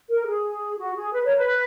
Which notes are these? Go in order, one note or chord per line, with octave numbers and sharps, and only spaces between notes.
A#4
G#4
F#4
G#4
B4
A#4 C#5
B4